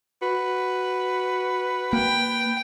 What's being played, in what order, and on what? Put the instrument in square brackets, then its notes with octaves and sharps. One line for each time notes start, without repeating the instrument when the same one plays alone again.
[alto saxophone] F#4 [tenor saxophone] B4
[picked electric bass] A#3 [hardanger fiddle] G5